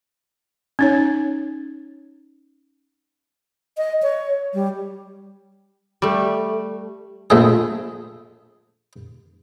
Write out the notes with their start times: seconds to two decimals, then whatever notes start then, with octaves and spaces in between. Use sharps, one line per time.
0.79 C#4 D#4 C#5
3.77 D#5
4.03 C#5
4.54 G3
6.02 G3 A3
7.30 A#1 A3 G#4